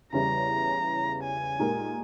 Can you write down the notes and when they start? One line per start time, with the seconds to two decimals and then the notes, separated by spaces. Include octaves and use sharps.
0.13 E2 C#3 G3 C#4 E4 A#5
1.23 G#5
1.59 A#2 G#3 D#4 G4 A#4